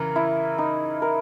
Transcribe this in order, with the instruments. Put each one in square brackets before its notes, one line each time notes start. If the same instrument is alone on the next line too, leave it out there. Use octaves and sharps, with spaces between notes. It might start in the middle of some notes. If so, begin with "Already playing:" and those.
Already playing: [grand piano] C#3 E3 [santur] A#4
[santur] E4
D#4
A#4